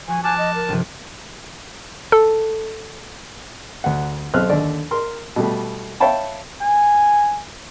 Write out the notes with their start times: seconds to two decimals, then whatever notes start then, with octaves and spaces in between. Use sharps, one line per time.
0.08 F3 F#4 G#5
0.24 G#5 A5 D6 F6 F#6
0.38 D#5
0.55 A#4
0.69 G1 C3 F3
2.12 A4
3.84 D2 F#5
4.34 B1 C4 F6 F#6
4.49 D#2 D3 D5
4.91 A#4 C6
5.36 B2 G3 A3
6.00 C#5 E5 F5 G5 A5 B5
6.61 G#5